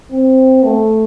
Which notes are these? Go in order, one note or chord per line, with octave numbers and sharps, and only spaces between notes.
C4
A3